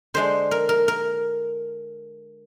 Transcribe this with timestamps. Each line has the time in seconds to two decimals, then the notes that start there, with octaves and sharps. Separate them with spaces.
0.14 D3 G#3 D4 C5
0.51 A#4
0.69 A#4
0.88 A#4